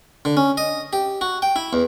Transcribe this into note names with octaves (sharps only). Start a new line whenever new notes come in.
D3
C#4
D#5
G4
F#4
G5
E4
E2